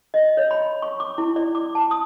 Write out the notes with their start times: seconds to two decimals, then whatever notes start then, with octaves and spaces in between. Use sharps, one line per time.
0.14 D#5
0.37 C#5
0.51 B5
0.82 C#6
1.00 D6
1.18 E4
1.36 D5
1.55 D6
1.75 A5
1.91 D#6